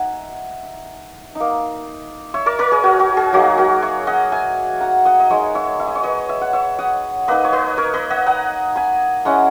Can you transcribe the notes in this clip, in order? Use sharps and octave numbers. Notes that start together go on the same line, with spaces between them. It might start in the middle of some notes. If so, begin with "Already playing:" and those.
Already playing: D#4 E5 F#5 G#5 A#5
A#3 D#4
C#5 E5
A#4 C#5
A#4 C#5
G#4
F#4
F#4
G#4
F#3 A#3 D#4 F#4
F#4 A#4
C#5 E5
D#5 F#5
E5 G#5
F#5 A#5
D#5 F#5
D#5
G#3 D#4 C#5 E5
C#5 E5
E5
D#5
C#5
B4 D#5
E5
F#5
C#5 E5
D#5 F#5
A#3 D#4 B4 D#5
C#5
B4 D#5
A#4 C#5
B4 D#5
D#5 F#5
F#5 A#5
G#5 B5
G#3 C#4 E4 F#5 A#5